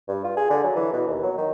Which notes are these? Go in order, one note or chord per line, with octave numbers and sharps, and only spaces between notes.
G2
F4
G#4
D3
F#3
E3
B2
D#2
F#3
D#3